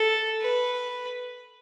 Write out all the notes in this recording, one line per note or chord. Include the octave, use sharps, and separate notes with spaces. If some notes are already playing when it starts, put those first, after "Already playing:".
Already playing: A4
B4